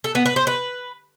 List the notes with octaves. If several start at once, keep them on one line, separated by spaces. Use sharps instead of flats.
A4
B3
B4
C5
B4